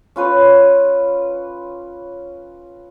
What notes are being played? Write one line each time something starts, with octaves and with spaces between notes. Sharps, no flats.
C#4 F4 B4 C#5